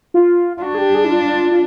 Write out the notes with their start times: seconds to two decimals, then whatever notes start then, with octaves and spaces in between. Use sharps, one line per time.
0.14 F4
0.57 F4
0.62 D4 F#4
0.75 G#4
0.78 G4
0.95 G#4
1.05 E4
1.11 F4
1.52 F4